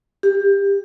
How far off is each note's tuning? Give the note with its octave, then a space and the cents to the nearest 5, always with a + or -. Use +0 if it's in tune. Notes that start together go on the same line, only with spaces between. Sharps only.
G4 +20